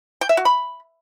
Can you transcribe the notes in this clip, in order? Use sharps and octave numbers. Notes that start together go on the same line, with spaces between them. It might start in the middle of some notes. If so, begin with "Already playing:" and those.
G5
E5
F#4
B5